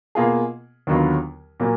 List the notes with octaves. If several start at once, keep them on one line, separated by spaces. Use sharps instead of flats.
B2 A#3 F4 G#4
D#2 D3 F#3 B3 F4
A#2 F#3 A#3